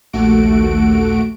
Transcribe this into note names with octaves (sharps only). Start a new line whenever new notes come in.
A#1 D#2 A3 F#4 D7